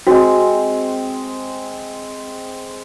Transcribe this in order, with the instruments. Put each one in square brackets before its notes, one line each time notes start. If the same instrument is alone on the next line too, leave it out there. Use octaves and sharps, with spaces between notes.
[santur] G#3 C4 [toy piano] F#4